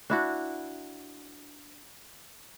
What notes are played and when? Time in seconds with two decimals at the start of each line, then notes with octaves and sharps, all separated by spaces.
0.10 D4 E4 F#4